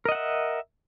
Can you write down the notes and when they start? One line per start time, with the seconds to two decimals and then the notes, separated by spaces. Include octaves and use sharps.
0.05 A#4
0.09 D#5
0.12 F#5
0.15 E5